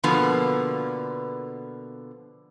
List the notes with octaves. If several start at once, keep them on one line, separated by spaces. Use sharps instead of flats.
B2 D3 F3 A#3 B3